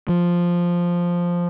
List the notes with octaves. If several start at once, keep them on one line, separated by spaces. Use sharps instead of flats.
F3